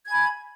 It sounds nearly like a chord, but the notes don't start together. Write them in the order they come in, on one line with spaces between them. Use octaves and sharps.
G#6 G#5 B5